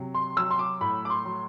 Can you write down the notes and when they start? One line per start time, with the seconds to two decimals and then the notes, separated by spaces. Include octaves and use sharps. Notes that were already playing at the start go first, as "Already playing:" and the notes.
Already playing: C3 F#3
0.15 C6
0.36 F#3 E6
0.51 C6
0.59 D6
0.81 A2 B5
1.05 D6
1.10 C6
1.25 F#3